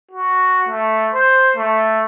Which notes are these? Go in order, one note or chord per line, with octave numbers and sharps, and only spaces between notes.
F#4
A3
C5
A3